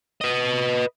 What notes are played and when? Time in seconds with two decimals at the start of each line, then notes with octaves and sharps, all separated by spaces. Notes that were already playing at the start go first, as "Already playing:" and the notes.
0.21 B4 D#5